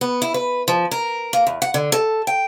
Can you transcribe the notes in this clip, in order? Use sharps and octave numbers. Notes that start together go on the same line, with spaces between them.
B3
E4
B4
F3
A#4
A#3
E2
F#5
D3
A4
G5